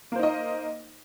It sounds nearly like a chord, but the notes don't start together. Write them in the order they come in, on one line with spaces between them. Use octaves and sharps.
A#3 C5 D#4 D#5